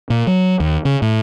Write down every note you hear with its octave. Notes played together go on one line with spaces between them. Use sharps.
A#2
F#3
D#2
C#3
A2